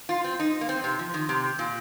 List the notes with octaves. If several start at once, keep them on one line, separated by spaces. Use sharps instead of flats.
F4
C4
D#4
A#3
C4
C3
F3
D#3
C3
A#2